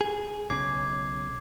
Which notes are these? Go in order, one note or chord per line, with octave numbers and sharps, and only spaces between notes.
G#4
B1 C#3 D6 G#6 C7